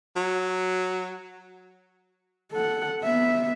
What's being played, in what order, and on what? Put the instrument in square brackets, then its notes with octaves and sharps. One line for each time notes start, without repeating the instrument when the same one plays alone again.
[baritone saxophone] F#3
[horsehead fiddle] A4 F#5
B3 E5